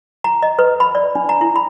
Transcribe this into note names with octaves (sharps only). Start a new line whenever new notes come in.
A#5
D#5
B4
B5
D5
D4
A#5
E4
B5